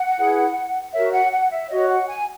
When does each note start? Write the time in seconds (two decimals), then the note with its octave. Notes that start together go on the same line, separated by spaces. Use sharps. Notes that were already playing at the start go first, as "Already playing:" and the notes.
Already playing: F#5
0.17 E4 G#4 B4
0.93 F#4 A#4 C#5 E5
1.12 F#5
1.31 F#5
1.51 E5
1.69 F#4 C#5 D#5
1.88 F#5
2.07 G#5